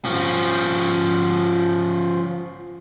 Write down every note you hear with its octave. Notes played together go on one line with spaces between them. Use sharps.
F3 C#4